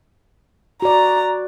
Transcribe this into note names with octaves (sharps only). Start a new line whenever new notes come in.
F#4 D5 A#5